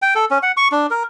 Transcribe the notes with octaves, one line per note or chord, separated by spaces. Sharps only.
G5
A4
C#4
F#5
C#6
D4
A#4